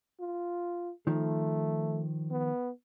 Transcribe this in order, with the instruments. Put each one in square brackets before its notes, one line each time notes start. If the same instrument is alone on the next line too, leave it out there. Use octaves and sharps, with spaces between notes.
[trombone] F4
[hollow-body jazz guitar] D#3 F3 [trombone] A3
[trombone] B3